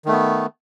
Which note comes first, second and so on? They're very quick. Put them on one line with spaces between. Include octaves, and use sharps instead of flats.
D#3 A3 B3